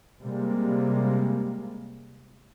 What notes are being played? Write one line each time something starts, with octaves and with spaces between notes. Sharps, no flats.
C3 G3 G#3 A#3